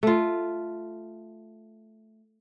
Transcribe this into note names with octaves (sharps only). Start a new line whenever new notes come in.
A3 F4